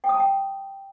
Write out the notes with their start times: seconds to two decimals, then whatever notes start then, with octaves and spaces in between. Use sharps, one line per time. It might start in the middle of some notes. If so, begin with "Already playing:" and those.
0.04 G5
0.09 D#6
0.14 A5
0.20 G5